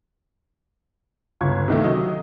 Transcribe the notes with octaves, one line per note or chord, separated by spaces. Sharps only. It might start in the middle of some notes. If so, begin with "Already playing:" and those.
G1 C#2 C#6 G#6
C3 D#3 A3
F#3 D#5